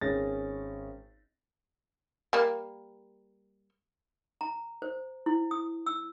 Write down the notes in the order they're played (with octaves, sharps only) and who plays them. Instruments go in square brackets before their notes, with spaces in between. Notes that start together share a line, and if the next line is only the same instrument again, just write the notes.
[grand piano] G#1 C#4 G#4 C#5 A6 A#6
[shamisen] G3 A#3
[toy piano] A#5
C5
E4
D#6
E6